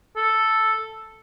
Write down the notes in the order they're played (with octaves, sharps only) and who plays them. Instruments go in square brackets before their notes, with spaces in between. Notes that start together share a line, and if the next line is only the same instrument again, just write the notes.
[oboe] A4